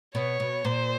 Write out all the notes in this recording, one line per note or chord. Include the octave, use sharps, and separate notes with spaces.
B2 C#5
B2
A#2 C5